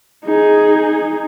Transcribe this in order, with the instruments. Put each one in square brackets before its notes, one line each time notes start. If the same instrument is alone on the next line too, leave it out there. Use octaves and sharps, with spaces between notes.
[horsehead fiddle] D#4 G#4